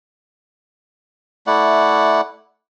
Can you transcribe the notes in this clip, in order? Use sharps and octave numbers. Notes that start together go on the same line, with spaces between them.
A3 E4 D5 F#5